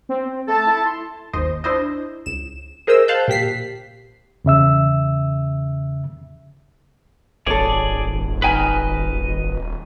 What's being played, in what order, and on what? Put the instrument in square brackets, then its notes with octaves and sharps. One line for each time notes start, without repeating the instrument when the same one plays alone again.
[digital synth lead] C4
[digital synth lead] A3 [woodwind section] A4 A5
[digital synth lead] E4
C6
[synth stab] G1 D#2 C5 D#5
D4 E4 C5 D#5
C#2 E7
G#4 A#4 C5 D#5 E6
C5 F5 A5 F#6 G6
A#2 G4 B6 C7
[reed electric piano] E2 C#3 E5 E6
[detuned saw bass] D#1 [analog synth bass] G#1 [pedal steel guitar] G#4 D5 [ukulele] A4 C#5
[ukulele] D#4 G5 G#5 [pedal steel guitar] B4 D#5 F6